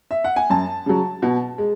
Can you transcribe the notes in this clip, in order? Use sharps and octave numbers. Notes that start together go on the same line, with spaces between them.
E5
F#5
G#5
F#2 A5
C#3 F#3
B2
G#3